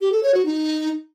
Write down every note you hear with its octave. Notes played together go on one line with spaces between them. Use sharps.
G4
A4
C#5
F#4
D#4